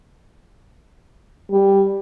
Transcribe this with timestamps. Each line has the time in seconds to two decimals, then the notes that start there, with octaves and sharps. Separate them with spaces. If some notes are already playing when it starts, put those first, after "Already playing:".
1.51 G3